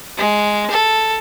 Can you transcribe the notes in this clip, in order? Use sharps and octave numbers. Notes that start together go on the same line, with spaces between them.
G#3
A4